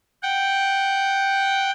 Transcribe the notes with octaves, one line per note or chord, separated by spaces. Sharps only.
F#5 G5